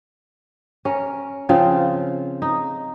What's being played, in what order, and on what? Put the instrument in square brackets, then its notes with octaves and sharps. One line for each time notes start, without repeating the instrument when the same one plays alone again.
[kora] C#4 A#4
C#3 F3 C4 F4
D#4